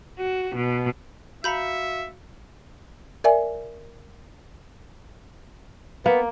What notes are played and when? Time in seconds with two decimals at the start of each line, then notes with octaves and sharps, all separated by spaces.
0.19 F#4
0.55 B2
1.44 F#4 E5 F5 A#5 B5 G6 C#7
3.24 A#4 D5 E5 G#5
6.06 A#3 B3